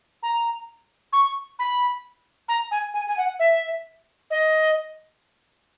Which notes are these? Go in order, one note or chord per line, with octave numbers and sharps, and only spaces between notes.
A#5
C#6
B5
A#5
G#5
G#5
G#5
F#5
E5
D#5